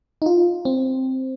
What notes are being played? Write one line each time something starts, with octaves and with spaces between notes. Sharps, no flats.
D#4
F4
C4